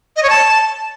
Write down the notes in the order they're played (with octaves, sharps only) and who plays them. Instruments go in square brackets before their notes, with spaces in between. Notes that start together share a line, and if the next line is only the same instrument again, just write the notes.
[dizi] D#5
C#5
A5